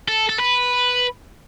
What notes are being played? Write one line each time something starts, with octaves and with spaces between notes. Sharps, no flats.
A4
A4
B4